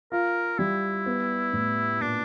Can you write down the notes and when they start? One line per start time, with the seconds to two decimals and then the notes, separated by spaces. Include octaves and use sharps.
0.12 F4 A#4
0.58 G3 E4
1.06 B3
1.53 A2
2.00 A#2 D4